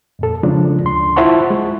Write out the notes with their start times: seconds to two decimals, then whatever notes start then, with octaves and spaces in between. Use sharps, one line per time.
0.19 F2 A#2 A4
0.43 C#3 F3 G#3 D4
0.84 D2 C6
1.16 E4 F4 C5 F#5 A5 C#6
1.50 G#3